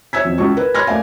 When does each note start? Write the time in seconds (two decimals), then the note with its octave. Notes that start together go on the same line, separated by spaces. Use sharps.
0.13 C#5 E5 E6 G#6 B6
0.25 F2
0.38 C#2 C#6
0.57 A#4 B4
0.74 C#5 B5 C6 F6 G#6 A#6
0.87 A3 A#4 D5 F5 G#5